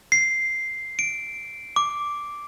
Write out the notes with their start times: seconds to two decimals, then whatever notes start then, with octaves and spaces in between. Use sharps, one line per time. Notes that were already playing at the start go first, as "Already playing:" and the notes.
0.12 C7
0.99 D7
1.76 D6